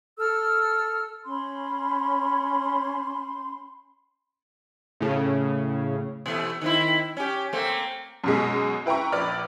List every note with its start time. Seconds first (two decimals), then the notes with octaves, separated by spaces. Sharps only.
0.18 A4 E6 F6
1.26 C#4 B5 C6
5.00 A2 C#3
6.26 B2 E3 A3
6.61 D#3 C4 E4
7.17 C#4 G4
7.53 A3 A#3 C4
8.24 F#2 B2 G#3
8.86 E4 B4 G5 A#5 C#6
9.12 A#1 B4 D5 B5 F6